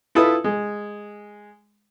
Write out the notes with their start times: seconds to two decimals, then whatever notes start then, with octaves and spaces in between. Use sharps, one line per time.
0.15 E4 F4 A4 B4 D#6
0.44 G#3